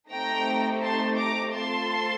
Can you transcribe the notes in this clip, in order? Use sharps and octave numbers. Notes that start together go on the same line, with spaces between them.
A3 C4 D#4 G4 G5 A#5
A5 C6
A#5 D6
A3 C4 F4 A4 A5 C6